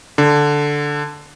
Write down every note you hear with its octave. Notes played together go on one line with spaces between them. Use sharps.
D3